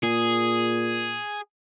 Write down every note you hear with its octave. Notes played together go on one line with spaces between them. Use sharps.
A#2 G#4